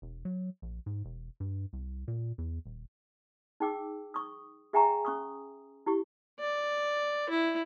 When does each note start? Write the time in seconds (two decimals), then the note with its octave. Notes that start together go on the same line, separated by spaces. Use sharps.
0.02 E1
0.25 F#3
0.62 A#1
0.86 G#2
1.05 E1
1.40 G2
1.73 C2
2.08 A#2
2.38 E2
2.66 D#1
3.60 D#4 G#4 G5 D6 E6
4.14 C#6 D#6
4.73 G#4 E5 G5 G#5 A#5 C#6
5.05 C#4 C#6 D#6
5.86 E4 G4 C#6
6.39 D5
7.29 E4